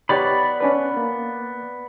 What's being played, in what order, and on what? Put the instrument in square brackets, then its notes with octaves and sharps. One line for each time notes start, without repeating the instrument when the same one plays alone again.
[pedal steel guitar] B3 D5 B5 [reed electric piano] D#4 G4 C#5
[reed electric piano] C#4 D4 B4
A#3